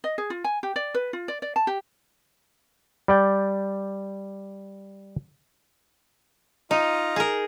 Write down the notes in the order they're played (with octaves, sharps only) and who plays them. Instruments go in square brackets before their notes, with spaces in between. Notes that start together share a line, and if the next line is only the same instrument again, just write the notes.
[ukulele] D#5
G#4
F4
G#5
G4
D5
B4
F4
D5
D5
A5
G4
[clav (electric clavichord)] G3 D5 G5
[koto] D#4 [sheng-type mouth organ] F4 D#5 A#5
[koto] G#4 A#4